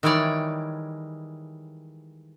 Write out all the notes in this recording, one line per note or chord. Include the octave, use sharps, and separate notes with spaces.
D#3 E3 G3 G#3 C#5 D5